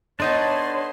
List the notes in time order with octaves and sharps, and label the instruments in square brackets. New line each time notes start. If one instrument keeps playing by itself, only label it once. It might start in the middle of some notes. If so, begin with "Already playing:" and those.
[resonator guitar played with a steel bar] B3 D#4 A4 [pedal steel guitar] D4 D#5 A5 [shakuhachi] C#5 [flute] C6